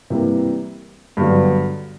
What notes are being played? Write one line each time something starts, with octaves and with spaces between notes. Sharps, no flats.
C3 E3 G3 A#3
G2 D3 F#3 B3